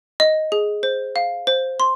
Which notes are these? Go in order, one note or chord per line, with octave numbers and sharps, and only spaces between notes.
D#5
G#4
C5
F5
C5
C6